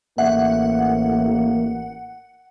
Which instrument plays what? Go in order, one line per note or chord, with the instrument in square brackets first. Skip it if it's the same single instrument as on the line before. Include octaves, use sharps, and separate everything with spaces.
[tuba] A1 [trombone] A#3 [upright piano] E5 [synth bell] F#5